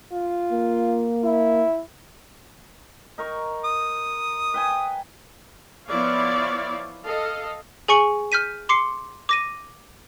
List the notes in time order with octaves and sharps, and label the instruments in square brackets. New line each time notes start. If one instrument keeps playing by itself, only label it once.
[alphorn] F4
[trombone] A#3
[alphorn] E4
[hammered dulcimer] D#4 A#4 C#6
[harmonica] D#6
[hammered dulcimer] B4 G5 G#5
[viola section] F3 B3 E4 C#5 D5 F5
A4 D#5 F5
[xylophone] G#4 G#5 C#6 C#7 F#7
F6 G6 B6 D#7
C6 D6 C7 C#7
D6 A#6 D#7